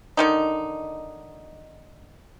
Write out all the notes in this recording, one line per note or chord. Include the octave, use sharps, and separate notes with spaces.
D3 D#3 D#4